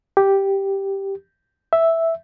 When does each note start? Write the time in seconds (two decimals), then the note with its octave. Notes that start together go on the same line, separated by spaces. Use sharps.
0.17 G4
1.73 E5